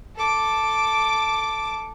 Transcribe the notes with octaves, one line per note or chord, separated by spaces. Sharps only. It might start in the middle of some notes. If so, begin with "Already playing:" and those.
A4 D6